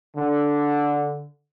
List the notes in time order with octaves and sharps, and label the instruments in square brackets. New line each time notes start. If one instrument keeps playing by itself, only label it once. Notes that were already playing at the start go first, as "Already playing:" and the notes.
[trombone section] D3